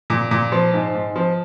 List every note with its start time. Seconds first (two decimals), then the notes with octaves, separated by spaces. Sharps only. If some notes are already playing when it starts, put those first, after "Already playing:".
0.10 A#2
0.31 A#2
0.52 F3
0.73 G#2
0.95 G#2
1.15 F3